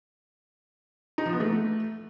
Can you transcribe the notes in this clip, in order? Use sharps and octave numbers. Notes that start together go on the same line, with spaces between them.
D#4
F3
B3
A3